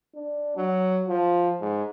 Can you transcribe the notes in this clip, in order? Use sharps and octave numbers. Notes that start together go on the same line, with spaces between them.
D4
F#3
F3
G#2